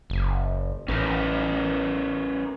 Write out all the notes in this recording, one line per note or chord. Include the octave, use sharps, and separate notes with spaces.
F#1
A1 C#4 A#4 B4